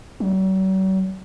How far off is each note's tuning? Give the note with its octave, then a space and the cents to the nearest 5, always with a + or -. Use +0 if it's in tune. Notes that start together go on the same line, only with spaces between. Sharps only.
F#3 +45